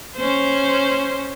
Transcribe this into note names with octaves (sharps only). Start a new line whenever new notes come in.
C#4 C5